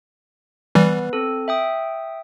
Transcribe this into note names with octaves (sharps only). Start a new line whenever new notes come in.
E3 G3 B3 B4
C4 A4
E5 G5 D#6